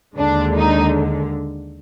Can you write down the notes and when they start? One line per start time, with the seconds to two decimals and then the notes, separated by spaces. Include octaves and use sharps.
0.17 D#2 D3 G#3 D4
0.55 D#4